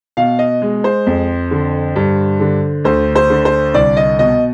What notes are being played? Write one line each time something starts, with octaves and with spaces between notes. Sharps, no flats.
B2 F5
D#5
G#3
C5
F2
D3
G2
D3
D2 C5
C5
D3
C5
C2 D5
D#5
B2 D#5